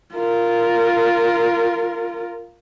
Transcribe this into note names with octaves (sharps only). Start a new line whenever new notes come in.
F4 A#4